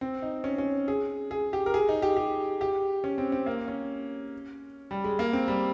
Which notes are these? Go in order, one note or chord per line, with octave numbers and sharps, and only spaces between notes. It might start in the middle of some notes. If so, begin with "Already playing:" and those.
C4
D#4
C#4
C#4
G#4
G#4
G4
A#4
G#4
D#4
G4
G4
G4
C#4
C4
C4
A#3
C#4
G3
G#3
A#3
C4
G3